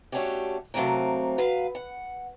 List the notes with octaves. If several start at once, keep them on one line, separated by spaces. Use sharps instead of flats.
A3 C#4 D4 F#4 G4
C3 F#3 A3 A#3 C4 A#4
F#3 B4 F5
F#5